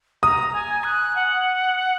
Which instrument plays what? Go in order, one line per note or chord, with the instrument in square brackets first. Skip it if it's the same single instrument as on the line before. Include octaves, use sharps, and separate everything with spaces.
[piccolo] A#5 [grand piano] D#6
[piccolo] G#5
F#6
F#5